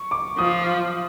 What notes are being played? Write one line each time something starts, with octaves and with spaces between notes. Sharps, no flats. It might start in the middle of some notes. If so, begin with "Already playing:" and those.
Already playing: C#6
D6
F3 D#6